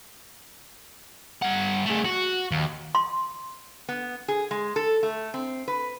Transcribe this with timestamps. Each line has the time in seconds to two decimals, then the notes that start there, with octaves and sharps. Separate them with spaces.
1.42 G2 F#5
1.86 A3 G#4
2.05 F#4
2.51 D#2
2.95 C6
3.89 B3
4.28 G#4
4.51 G#3
4.76 A4
5.03 A3
5.34 C4
5.68 B4